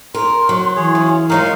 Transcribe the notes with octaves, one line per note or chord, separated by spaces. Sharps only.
A#4 C6
F#3
E3 G#4 C#5
C#3
F#3 G#3 D#4 F4 A#4 F5 D#6